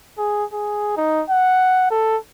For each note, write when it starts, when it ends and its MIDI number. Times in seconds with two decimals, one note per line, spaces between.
0.18 0.44 68
0.53 0.95 68
0.97 1.23 63
1.30 1.86 78
1.91 2.17 69